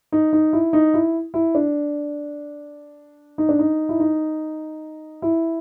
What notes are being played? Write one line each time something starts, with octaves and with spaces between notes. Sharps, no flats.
D#4
D#4
E4
D#4
E4
E4
D4
D#4
D4
D#4
E4
D#4
E4